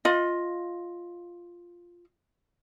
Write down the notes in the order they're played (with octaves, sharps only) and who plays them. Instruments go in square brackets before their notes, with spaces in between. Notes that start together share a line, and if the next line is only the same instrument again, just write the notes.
[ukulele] F4 D#5